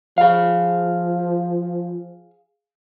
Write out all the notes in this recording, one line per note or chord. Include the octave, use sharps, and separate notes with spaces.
F3 G#4 F5